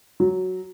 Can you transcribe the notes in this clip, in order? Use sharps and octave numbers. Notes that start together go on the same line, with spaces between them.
F#3